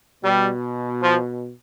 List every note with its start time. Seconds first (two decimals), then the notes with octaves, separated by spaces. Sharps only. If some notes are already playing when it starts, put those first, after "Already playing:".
0.24 B2 G3
1.03 F3